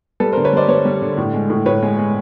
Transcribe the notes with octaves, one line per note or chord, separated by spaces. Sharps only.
G3 A4 B4
A#4 C5
D3
B4 C#5
G3 C5 D5
G3 B4 C#5
G3
D3
A2
G#3
A2
A2 B4 C#5
G#3
G#3